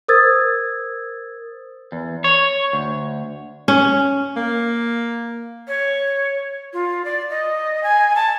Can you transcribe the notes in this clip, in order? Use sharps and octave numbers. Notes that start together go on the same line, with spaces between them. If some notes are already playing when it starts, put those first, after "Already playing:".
A#4 C5 D#6 E6 G#6 A6
E2
C#5
D2
C#4
A#3
C#5
F4
D5
D#5
G#5
A5